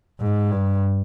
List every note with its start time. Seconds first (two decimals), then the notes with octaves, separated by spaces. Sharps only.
0.20 G#2
0.51 G2